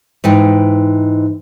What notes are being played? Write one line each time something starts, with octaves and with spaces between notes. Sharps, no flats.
G#2 E3 D#4 G5